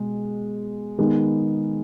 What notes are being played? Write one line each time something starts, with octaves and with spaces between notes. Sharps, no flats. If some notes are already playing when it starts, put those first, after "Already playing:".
Already playing: B2 G#3
D#3 G#3 B3